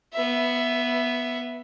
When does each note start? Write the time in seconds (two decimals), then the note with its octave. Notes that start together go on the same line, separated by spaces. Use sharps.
0.13 B3 E5